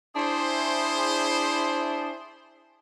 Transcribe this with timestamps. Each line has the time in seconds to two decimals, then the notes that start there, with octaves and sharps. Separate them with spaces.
0.16 D4 E4 G#4 C5